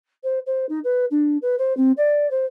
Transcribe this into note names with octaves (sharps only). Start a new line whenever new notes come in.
C5
C5
D#4
B4
D4
B4
C5
C4
D5
C5